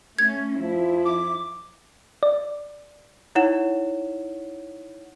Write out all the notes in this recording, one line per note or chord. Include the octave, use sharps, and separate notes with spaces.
A3 C#4 G#6
F2 F3 E4
D6
D5
D#4 E4 C#5 F#5 E7